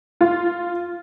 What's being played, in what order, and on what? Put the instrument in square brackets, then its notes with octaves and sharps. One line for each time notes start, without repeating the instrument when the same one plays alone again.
[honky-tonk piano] F4